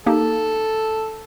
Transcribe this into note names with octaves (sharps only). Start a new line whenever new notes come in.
A#3 D#4 G4 A4